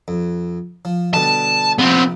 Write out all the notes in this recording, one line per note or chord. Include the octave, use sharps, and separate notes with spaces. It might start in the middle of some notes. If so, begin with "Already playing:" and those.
F2
F3
B2 D3 G3 A5
A#1 C3 B3 C4